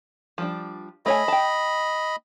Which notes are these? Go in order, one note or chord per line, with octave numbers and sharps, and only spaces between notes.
F3 G3 D4
A3 C#5 D#5 G#5 B5
G5 A5